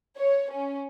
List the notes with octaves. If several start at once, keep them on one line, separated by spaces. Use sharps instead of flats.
C#5
C#4